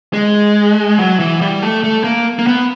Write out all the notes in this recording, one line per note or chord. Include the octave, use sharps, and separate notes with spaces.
G#3
F#3
E3
G3
A3
A3
A#3
A#3
B3